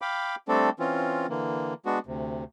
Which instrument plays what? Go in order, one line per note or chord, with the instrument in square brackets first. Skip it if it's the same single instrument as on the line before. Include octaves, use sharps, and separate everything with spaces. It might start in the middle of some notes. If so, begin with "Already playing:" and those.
[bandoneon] F5 G5 B5 D6
G3 A3 C4 D4 A4
E3 C4 C#4 F4
D3 E3 A#3
G#3 B3 D4 F#4
D2 C3